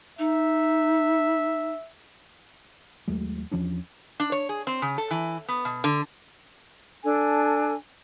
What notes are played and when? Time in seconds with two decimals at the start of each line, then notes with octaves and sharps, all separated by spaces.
0.19 D#4 E5
3.08 D#2 F#3 G#3 A3
3.51 E2 F3 C#4 D4
4.20 D4
4.32 C#5
4.49 G#4
4.67 C4
4.82 C#3
4.98 A4
5.11 E3
5.48 B3
5.65 B2
5.84 D3
7.03 D4 A4 G#5